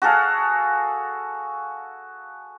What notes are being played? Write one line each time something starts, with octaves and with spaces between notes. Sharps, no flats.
F#4 G#4 A4 F5